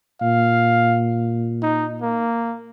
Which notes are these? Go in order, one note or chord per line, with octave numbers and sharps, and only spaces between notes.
A#2 F5
D#4
A#3